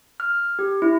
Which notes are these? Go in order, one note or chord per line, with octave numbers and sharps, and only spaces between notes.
F6
G4
E4